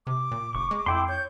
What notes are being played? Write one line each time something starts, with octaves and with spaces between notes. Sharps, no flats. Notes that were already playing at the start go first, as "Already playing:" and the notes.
C3 D6
A#2
F#1 C#6
G#3
F2 E4 G5 C6
C#5 G6